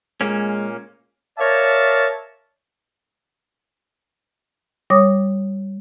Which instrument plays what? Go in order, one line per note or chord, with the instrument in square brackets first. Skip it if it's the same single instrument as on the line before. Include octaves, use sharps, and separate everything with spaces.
[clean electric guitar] A#2 A#3 C#4 [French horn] G#3
[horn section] A#4 C#5 D5 E5 F5 A5
[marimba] G3 C#5 D6 D#6